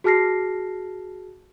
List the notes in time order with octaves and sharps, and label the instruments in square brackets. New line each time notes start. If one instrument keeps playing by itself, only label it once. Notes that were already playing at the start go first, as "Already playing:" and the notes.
[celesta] F#4 G#4 A5 F6 A#6 C7